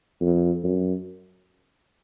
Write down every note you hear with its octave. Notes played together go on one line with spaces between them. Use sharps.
F2
F#2